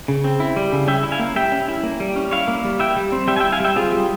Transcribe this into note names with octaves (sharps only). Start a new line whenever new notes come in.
C#3
C4
E4
G3
C#3
C#4 E5 G5
E4
F5 G#5
A#3
G3 E5 G5
C#4
E4
A#3
G3
C#4
E4 C#5 F5
A#3
G3
E4 E5 G5
G3
C4
G3 E5 G5
G#5
E5 G5
E4
F5 G#5
G3 E5 G5
C4 F4 G#4
G3